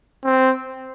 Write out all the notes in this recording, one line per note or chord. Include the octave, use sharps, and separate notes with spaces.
C4